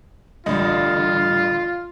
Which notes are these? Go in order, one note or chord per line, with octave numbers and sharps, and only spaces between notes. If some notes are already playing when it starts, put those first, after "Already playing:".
A1 G2 D3 F4 D#5